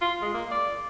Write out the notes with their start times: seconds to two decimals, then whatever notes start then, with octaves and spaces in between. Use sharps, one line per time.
0.01 F4
0.22 G#3
0.34 A#3
0.51 D5